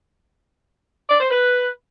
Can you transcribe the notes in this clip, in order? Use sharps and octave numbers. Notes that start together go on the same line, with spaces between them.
D5
C5
B4